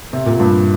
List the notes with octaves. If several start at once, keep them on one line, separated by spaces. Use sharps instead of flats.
C3
A#2
G2